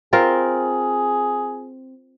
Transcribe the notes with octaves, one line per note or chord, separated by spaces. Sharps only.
C4 F4 G#4 A#4